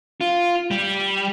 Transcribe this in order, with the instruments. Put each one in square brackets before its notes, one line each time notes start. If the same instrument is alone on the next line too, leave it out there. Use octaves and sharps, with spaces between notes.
[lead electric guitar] F4
G3